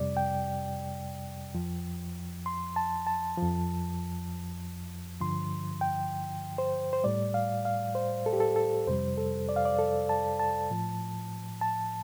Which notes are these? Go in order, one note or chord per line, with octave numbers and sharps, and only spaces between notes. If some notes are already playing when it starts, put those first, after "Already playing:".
Already playing: F2 C3 G3 D5
G5
F2 F3
C6
A5
A5
F3
F2
G2 D3 F3 C6
G5
C5
C5
A2 G3 D5
F5
F5
C5
A4
G4
A4
A4
F2 C3 G3 C5
A4
D5
F5
D5
A4
A5
A5
A2 F3
A5